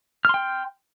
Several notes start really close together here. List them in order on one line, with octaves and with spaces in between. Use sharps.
F6 C6 G5